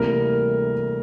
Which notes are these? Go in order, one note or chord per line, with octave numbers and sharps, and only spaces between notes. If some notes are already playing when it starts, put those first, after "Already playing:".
Already playing: D2 C3 E3 G3 A#3 A#4